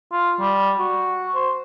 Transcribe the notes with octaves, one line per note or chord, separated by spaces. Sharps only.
F4
G3
F#4
C5